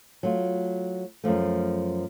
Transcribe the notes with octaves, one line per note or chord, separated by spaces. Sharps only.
F#3 A3 F4
F#2 F3 A3